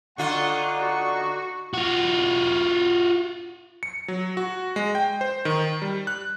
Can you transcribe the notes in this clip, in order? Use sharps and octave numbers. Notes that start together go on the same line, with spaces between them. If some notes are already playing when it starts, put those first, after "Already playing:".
D3 D#4 F4 D5 F#5 C#6 F#6
F#4 C#6
F4 F#4
C#7
F#3
F#4
G#3
G5
C5
D#3
G3
F#6